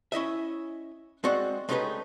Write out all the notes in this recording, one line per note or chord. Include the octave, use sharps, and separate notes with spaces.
C#4 E4 D#5 E5
G#3 C4 F#4 D5 F#5
G#3 A3 C#4 D#4 G4 B4